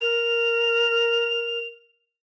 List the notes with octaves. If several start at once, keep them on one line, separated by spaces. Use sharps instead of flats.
A#4 F7